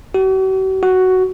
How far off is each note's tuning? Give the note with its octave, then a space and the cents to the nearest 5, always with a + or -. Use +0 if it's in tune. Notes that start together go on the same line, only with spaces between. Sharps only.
F#4 +45
F#4 +5